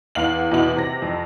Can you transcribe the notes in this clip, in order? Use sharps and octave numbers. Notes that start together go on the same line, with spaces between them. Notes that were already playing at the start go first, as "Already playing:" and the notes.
E2 F5 F#7
E2 B2 E4 F#7
C3 A#6
F2